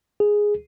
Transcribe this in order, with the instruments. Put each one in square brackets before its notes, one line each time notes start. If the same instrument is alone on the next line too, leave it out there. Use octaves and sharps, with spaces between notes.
[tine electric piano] G#4